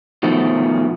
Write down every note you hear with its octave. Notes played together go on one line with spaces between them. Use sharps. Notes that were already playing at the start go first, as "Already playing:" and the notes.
B2 D#3 F3 A3 B3